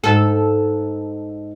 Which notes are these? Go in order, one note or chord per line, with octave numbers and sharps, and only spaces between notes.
G#2 A4